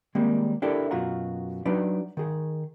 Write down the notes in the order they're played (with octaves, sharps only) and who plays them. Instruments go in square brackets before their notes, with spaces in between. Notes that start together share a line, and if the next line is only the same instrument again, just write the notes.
[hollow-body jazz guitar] D#3 G3 G#3 A#3 C4
D4 E4 G4 A4 A#4
F#2 B2 F4 F#4 A#5
F#3 D4 D#4 B4 D5
D#3 G#4